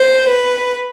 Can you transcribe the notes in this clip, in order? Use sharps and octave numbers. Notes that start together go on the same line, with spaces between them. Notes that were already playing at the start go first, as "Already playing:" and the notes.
Already playing: C5
B4